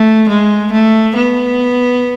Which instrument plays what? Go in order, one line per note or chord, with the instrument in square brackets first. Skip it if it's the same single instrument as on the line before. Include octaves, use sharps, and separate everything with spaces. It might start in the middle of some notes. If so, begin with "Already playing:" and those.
Already playing: [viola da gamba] A3
G#3
A3
B3